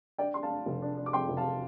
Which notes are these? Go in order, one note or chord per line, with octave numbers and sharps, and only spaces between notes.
D4 D5 G5
D4 C6
F5 A5
D4
F1
D4
D4
D6
F2 G5 C6
F1
F5 A5